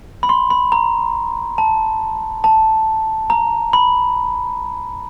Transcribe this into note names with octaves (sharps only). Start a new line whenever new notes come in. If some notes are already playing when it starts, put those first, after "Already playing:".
B5
C6
B5
A#5
A5
A5
A#5
B5